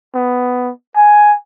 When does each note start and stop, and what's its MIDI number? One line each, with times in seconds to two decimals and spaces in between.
0.15 0.71 59
0.97 1.34 80